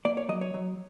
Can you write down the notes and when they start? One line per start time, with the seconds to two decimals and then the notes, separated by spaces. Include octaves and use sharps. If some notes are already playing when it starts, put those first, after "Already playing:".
0.05 A#3 D5
0.17 C#5
0.29 F#3 D#5
0.41 C#5
0.54 F#3